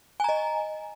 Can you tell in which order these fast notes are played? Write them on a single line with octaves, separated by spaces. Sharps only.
G#5 A#5 D#5